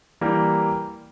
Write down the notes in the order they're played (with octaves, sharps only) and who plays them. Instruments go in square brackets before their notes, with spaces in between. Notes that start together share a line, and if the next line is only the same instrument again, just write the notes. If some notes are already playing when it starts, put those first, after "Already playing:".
[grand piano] E3 G3 A#3